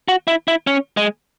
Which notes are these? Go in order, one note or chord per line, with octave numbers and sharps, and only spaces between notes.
F#4
E4
E4
C#4
G#3